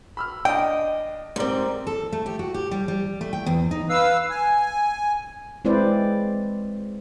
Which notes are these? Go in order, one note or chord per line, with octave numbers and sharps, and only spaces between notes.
B5 E6 F6
D4 D#5 G5
G#2 G3 C4 A#4 D5
A4
A3
G4
F#4
G4
G3
G3
A3
G5
E2
D#4
B4 F5 E6
G#5
G#3 C4 E4 B4 C5 D5